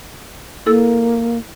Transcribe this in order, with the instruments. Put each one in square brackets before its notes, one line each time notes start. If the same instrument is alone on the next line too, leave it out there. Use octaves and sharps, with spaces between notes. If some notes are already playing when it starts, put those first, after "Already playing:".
[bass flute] A#3 [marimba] E4 A4 E6